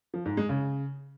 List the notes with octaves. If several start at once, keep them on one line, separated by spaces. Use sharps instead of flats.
F3
G#2
G#3
C#3